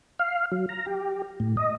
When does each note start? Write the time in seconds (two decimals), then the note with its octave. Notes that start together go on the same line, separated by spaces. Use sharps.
0.19 F5
0.52 F#3
0.69 A#5
0.86 G4
1.40 A2
1.57 D#5